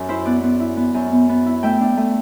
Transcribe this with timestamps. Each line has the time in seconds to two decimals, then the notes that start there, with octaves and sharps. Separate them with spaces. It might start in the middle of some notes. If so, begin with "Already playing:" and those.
Already playing: F#2 A4
0.09 E4 C5 E5
0.25 B3 D5 F#5
0.43 B3
0.60 E4
0.77 B3
0.94 F#2
1.12 B3
1.29 B3
1.46 E4
1.63 A3 E5 G5
1.80 D4
1.97 A3